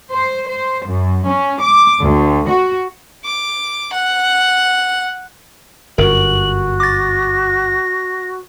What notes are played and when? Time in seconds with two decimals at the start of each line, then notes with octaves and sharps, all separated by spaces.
0.12 C5
0.48 C5
0.86 F#2
1.27 C#4
1.60 D6
2.02 D2
2.48 F#4
3.24 D6
3.93 F#5
5.98 G1 F#2 F#4 A#4 F#7
6.80 D6 A6 A#6